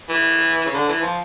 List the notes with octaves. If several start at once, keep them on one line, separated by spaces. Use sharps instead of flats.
E3
C#3
D3
E3
F3